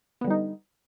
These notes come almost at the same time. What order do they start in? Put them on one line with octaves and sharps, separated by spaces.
B3 D3 G3 D#4